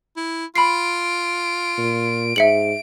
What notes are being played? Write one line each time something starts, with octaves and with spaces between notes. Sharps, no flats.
E4
F4 B5 C7 D7
A#2
G#2 E5 C#7 F#7